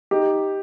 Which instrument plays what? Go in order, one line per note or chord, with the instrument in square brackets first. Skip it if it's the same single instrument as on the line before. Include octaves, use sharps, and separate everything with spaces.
[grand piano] D#4 G4